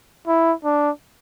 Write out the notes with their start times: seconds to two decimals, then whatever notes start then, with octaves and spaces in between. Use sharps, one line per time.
0.27 E4
0.64 D4